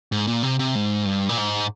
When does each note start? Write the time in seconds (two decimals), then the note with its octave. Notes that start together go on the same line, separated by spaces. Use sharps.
0.12 G#2
0.27 A#2
0.43 C3
0.59 C3
0.75 G#2
1.05 G2
1.29 A#2
1.38 G#2